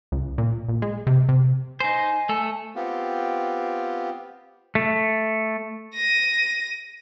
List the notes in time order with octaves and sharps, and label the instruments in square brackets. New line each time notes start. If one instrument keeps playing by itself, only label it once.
[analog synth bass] C#2
A#2
A#1
G#3
C3
C3
[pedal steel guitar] D#4 C5 [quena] G#5
[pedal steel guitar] A3 A4
[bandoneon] B3 C4 F4 G4
[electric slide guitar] A3
[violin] A#6 D#7